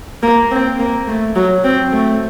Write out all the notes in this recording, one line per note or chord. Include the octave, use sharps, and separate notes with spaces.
A#3
C4
A#3
A3
F#3
C4
A3